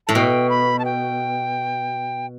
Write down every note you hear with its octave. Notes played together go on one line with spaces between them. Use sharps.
A2 A5
B2 G5
B5
A5
G5